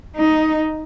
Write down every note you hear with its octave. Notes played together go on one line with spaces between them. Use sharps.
D#4